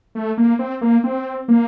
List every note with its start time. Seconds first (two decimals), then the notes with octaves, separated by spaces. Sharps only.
0.15 A3
0.38 A#3
0.59 C4
0.81 A#3
1.04 C4
1.48 A#3